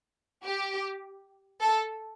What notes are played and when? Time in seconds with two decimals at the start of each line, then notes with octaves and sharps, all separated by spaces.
0.45 G4
1.62 A4